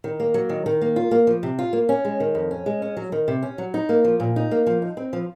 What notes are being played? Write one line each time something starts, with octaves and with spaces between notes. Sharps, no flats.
D#3
A#3
F#3
D#3
D#3
A#3
F4
A#3
F3
C3
F4
A#3
C#4
G#3
D#3
F2
C#4
G#3
C#4
F#3
D#3
C3
C#4
F#3
D#4
A#3
F3
A#2
D#4
A#3
F3
D#4
C4
F3